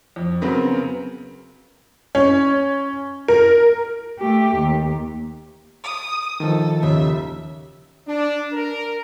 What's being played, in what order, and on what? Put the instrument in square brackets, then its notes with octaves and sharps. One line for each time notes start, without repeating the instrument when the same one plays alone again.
[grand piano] F2
C#3 F#3 B3 C4 A#4
[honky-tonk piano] C#4
A#4
[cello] A3 G4
D#2
[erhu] D#6
[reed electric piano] D#3 F3 [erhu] A4
[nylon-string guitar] D#2 C#3 [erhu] E5
[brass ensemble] D4
A#4